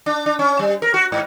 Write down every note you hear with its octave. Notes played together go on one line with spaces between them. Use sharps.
D4
D4
C#4
G3
A#4
F#4
G#2